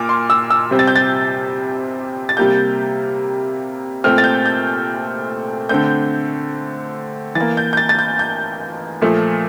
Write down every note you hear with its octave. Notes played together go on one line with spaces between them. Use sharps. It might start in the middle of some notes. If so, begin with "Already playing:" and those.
Already playing: A#2 D6 F6
C6
E6
E6
C3 G3 C4
A6
G6
A6
A6
C3 G3 A#3 G6
A#2 A3 C4 F6
A6
G6
G6
D3 A3 C4 G6
E3 A6
A#3
G6
G6
A6
A6
G6
G6
A#2 F3 A3